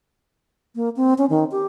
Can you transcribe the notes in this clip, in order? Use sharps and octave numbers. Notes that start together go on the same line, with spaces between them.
A#3
C4
C#4
D#3
G4